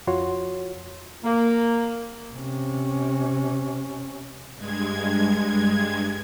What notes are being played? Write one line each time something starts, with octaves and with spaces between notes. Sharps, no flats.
F2 F4 F#4 C#5 C6
A#3
C3 C#4
G2 G#3 G#6